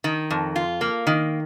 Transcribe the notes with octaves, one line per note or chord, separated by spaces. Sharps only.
D#3
F2
F4
A#3
D#3